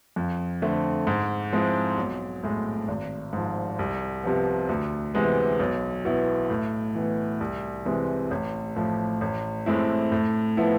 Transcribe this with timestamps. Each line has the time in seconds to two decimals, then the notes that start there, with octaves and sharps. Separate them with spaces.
0.16 F2
0.62 D3 A3 C4
1.07 G#2
1.53 F3 G#3 C4 E4
1.98 B1
2.43 A2 G#3
2.88 G#1
3.33 G#2 F3
3.79 C2
4.24 C3 F3 B3
4.69 D2
5.14 C3 E3 G#3 B3
5.60 B1
6.05 B2 B3 E4
6.50 A2
6.95 E3 B3
7.41 C2
7.85 C3 E3 G#3 C4
8.31 A1
8.76 A2 F3
9.21 A1
9.66 A2 G#3 C4 E4
10.12 A2
10.57 F3 B3 E4